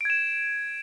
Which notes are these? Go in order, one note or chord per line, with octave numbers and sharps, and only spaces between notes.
G#6 D7 E7